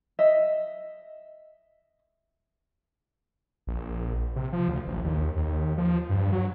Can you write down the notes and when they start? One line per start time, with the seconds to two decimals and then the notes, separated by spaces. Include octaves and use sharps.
0.19 D#5 E5
3.67 A#1
4.36 C3
4.52 F3
4.69 D2
4.87 A1
5.04 D#2
5.36 D#2
5.78 F3
6.09 G2
6.32 F#3